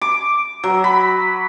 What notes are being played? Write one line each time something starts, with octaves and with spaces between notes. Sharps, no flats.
D6
F#3
B5